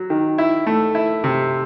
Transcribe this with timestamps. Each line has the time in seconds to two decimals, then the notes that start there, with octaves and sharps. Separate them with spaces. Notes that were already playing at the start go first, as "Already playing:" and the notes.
Already playing: F#3
0.10 D#3
0.38 E4
0.67 A3
0.95 E4
1.24 C3